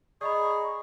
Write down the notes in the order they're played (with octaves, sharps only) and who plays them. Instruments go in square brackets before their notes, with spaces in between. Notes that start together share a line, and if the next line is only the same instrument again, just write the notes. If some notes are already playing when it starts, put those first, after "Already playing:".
[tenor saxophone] G#4 [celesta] D5 D#5 B5 [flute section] A#5 C#6